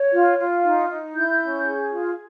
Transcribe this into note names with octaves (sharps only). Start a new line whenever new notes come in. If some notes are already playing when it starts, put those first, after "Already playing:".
Already playing: C#5
F4
F4
D#4
D#4
E4 G6
C#4
G#4
F4